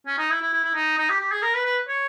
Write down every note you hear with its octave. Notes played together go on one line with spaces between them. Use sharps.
C#4
D#4
E4
E4
E4
E4
D#4
D#4
G4
G4
G#4
A#4
B4
B4
C#5